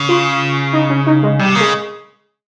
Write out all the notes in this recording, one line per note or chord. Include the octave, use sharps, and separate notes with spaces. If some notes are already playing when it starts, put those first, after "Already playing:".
Already playing: C#3
F4
D#4
C#4
D#4
G#3
C3 G3
C#3 A#3
G#3